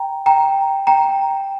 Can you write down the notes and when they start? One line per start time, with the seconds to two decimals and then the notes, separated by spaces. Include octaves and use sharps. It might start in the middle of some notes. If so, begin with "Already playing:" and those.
Already playing: G5 A#5
0.26 G5 A#5
0.87 G5 A#5